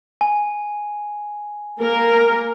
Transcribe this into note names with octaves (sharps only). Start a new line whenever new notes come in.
G#5
A#3 A#4